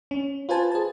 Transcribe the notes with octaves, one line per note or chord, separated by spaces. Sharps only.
C#4
F4 B4 C5 G#5 A5
G#4 A5